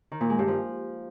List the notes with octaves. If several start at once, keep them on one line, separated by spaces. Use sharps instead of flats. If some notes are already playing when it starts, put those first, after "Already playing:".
D#3
A#2
G#3
G2
F3